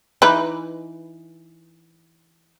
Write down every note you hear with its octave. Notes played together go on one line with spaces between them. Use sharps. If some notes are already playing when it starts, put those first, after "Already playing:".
E3 D#4 B4